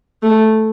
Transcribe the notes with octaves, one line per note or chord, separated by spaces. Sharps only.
A3